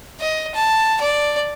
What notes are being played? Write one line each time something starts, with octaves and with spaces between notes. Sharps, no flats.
D#5
A5
D5